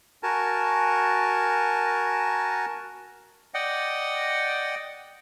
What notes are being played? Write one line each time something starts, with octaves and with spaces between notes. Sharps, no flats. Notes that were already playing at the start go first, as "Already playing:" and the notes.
F#4 A#4 G#5 A5
D5 D#5 F#5 G5